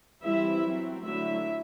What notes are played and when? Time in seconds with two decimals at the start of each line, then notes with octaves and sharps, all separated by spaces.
0.23 E3 G3 C4 E4 E5
0.64 F#3 C4
1.03 D3 F#3 A3 E4 E5